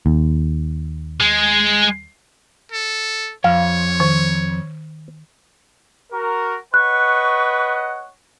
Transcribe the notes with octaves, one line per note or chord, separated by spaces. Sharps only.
D#2
G#3
A4
F2 C#5 F5
D#3
F#4 A#4
B4 C#5 D#5 F#5 C#6 F#6